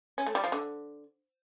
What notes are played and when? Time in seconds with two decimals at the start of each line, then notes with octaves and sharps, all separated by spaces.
0.18 C#4
0.26 A3
0.35 G3
0.44 F3
0.52 D3